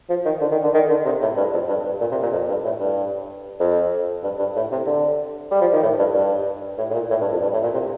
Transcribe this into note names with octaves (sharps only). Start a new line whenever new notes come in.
F3
D#3
D3
D#3
D3
D#3
D3
C3
A2
G2
F2
G2
G2
A#2
C3
A#2
F2
G2
A2
G2
F2
G2
G2
A2
C3
D3
G3
F3
D#3
A2
G2
G2
A2
A2
A#2
A2
G2
F2
G2
A2
A#2
C3